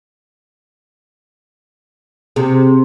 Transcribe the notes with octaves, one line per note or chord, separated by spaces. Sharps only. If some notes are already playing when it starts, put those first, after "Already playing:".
C3 G4 G#4